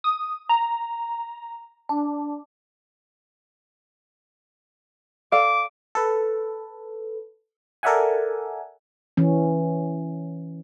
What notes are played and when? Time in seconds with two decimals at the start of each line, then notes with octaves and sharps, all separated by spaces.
0.04 D#6
0.49 A#5
1.89 D4
5.32 A4 D5 F5 D6
5.95 A4 B4
7.83 A4 A#4 D5 E5 F#5 G#5
9.17 E3 C#4